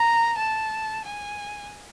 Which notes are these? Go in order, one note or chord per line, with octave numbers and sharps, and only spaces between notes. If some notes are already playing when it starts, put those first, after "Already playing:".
Already playing: A#5
A5
G#5